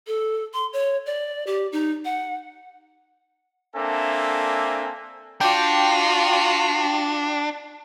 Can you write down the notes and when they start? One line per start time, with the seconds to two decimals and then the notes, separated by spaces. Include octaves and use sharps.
0.07 A4
0.54 C6
0.73 C#5
1.06 D5
1.47 G4
1.72 D#4
2.05 F#5
3.75 A#3 C4 D4 A4 E5 G#5
5.41 D4 F4 F#4 G5 D6